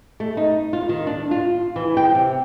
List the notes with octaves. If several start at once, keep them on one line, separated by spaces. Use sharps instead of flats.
A3
D#4
F4
D#3
D4
F4
E3
G5
C3